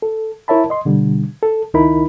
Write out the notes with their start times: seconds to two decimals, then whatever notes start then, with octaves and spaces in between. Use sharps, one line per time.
0.02 A4
0.48 E4 A#4 C#5 E5 A5 B5
0.70 D#5 C6
0.85 B2 D3 G3
1.43 A4
1.74 C#2 D#3 D#4 E4 A#4 B5